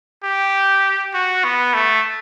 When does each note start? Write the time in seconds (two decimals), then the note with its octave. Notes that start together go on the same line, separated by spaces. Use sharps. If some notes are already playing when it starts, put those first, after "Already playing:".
0.23 G4
1.14 F#4
1.44 B3
1.74 A3